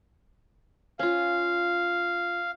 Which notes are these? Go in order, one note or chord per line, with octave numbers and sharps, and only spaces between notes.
C#4 F4 F5